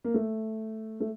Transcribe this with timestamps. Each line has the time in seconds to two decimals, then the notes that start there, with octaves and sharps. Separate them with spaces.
0.04 A#3
0.14 A3
1.00 A3